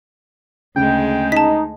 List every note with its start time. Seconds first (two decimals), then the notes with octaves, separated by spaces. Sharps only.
0.76 D2 C#3 G#3 G5
1.32 D#4 A5 B6